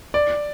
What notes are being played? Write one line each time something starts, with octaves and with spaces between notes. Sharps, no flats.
D5